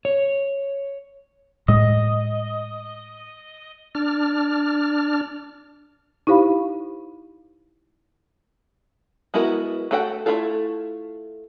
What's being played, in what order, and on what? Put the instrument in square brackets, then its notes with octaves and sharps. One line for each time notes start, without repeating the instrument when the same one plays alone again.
[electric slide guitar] C#5
[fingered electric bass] A2 G#3 [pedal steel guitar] D#5
[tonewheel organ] D4 F6
[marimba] D#4 E4 G4 C5 F5 B5
[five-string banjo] G#3 B3 E4 F#4 A#4
A3 F#4 A4 F#5 G5
A3 A#3 E4 F4 A4